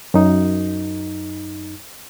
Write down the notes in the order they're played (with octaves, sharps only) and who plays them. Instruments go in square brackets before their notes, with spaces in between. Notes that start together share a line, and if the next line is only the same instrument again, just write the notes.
[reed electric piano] F#2 D#4